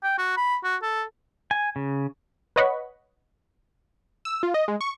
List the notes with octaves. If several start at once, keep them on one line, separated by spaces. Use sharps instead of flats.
G5
F#4
B5
F#4
A4
G#5
C#3
B4 C#5 D#5 F#5 B5 C#6
E6
F4
D#5
G#3
C#6